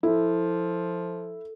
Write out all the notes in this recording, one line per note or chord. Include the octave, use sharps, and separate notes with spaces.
F3 E4 A4